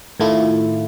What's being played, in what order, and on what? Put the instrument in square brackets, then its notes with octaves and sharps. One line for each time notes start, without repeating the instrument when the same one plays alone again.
[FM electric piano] A2 D#3 A3 E4 F4